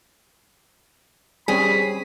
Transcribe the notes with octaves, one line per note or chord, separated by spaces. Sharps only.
G3 C4 C#4 G#4 B5